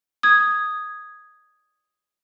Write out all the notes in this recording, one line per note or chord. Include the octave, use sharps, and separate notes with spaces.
D#6 G#6